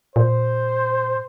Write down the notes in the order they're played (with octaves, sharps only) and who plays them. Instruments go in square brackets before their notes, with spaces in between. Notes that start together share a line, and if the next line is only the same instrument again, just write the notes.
[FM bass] A#2 [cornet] C5